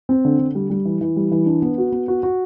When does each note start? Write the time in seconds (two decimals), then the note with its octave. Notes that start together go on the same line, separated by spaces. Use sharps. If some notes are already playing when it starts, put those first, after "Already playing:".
0.09 C4
0.25 D3
0.39 D3
0.55 G3
0.70 G3
0.85 E3
1.01 E3
1.16 G3
1.31 E3
1.46 D4
1.62 B3
1.78 F#4
1.92 B3
2.08 F#4
2.23 F#4